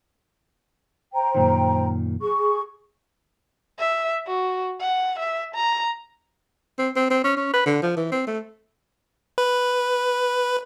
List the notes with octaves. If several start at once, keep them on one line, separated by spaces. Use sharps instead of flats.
C5 G5 A#5
F#2 A#2 D#3
G#4 C#6
E5
F#4
F#5
E5
A#5
C4
C4
C4
C#4
C#4
B4
D3
F3
E3
C4
A3
B4